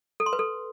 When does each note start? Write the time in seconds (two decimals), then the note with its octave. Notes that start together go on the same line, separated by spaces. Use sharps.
0.20 A4
0.26 C6
0.33 B4
0.39 A4